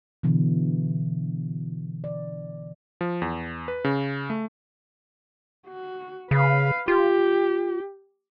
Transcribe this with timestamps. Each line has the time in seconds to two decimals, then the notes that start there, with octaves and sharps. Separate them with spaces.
0.23 B2 D3 E3
2.04 D5
3.01 F3
3.22 E2
3.68 B4
3.84 C#3
4.30 A3
5.67 F#4
6.31 C#3 B4 F5
6.88 F4 G4